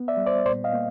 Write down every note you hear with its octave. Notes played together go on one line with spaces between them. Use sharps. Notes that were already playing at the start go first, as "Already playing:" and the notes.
Already playing: B3
D5 E5
G3
C5 D5
A#2 C5 D5
D#5 F5
A#3